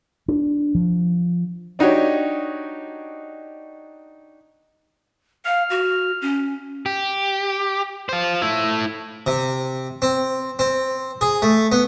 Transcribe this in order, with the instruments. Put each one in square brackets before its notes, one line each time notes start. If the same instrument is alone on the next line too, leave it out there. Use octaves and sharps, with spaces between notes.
[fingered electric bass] D4
F3
[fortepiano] D4 D#4 F#4 G4 C#5
[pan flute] F5 [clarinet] F6
[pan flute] F#4
C#4
[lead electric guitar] G4
F4 C5
A3 E4
[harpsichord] C3
C4
C4
G#4
A3
B3